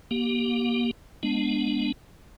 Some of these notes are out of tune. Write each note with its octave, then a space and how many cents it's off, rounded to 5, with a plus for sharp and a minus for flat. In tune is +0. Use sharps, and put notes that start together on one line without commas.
A#3 +35 G4 -15
G#3 +0 B3 -10 D4 +0